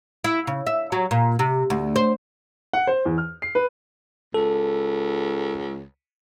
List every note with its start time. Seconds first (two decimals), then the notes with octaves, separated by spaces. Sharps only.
0.24 E4
0.47 C#3
0.67 E5
0.92 F#3
1.11 A#2
1.39 C3
1.70 D2
1.96 C5
2.73 F#5
2.87 C5
3.05 E2
3.18 F6
3.42 C7
3.55 B4
4.34 C#2 A4